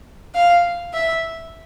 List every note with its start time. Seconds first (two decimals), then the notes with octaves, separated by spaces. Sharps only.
0.35 F5
0.93 E5